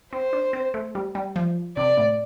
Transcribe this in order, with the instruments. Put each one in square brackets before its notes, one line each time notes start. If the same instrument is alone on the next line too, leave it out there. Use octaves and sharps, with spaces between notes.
[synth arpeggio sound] C4 [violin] C5
[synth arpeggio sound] D4
C4
A3
G3
G3
F3
[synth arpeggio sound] C3 [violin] D5
[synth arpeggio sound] A2